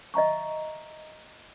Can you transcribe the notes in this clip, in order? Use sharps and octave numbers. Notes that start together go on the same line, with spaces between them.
D#5 E5 A#5 C#6